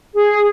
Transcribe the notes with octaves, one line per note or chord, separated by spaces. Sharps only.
G#4